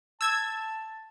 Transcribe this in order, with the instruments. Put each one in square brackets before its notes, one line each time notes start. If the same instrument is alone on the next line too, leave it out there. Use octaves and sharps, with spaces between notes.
[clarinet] A5 [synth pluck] E6 G#6